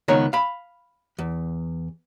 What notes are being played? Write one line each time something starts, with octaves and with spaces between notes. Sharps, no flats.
C#2 D#3 B3 C#5 A#5
F5 B5
E2